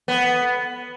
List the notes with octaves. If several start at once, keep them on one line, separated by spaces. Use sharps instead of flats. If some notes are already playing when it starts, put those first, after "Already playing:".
B3